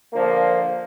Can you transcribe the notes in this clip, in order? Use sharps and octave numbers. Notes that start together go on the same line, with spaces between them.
D3 F3 A#3